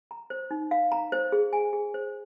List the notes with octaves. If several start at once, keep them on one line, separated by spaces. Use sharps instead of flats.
A#5
C5
D#4
F5
A#5
C5
G#4
G#5
G#4
C5